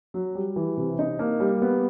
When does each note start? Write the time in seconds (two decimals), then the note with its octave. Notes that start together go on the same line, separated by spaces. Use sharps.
0.14 F#3
0.35 G3
0.56 E3
0.77 C3
0.99 D#4
1.19 A#3
1.40 G3
1.62 B3